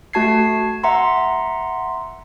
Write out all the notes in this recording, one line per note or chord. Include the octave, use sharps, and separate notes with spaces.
A3 F#4 A5 G#6 C7
E5 F#5 A#5 C6